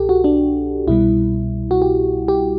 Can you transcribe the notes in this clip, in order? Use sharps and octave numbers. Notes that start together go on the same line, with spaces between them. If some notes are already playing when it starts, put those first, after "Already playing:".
Already playing: C2 B2 G4 A4
F#4
D4
C2 B2 G3 E4
F#4
G4
G4